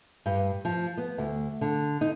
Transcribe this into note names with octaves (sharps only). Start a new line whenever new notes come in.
G2
F3
B3
D2
D3
D#4